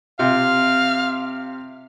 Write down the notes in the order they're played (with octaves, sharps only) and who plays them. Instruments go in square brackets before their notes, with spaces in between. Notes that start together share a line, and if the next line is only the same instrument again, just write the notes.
[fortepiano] C3 F4 [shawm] F5